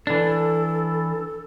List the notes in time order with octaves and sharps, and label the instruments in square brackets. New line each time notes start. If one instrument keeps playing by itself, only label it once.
[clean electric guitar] E3 D4 [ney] A4